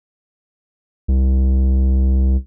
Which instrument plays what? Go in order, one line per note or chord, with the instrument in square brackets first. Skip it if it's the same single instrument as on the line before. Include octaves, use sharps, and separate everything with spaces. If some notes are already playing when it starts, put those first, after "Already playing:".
[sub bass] C2